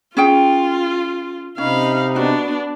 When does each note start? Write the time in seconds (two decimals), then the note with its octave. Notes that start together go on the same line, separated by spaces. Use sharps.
0.17 C#4 F4 G#4 G5
1.58 C3 C#4 D#4 F5 B5
2.16 B3 D4 F#4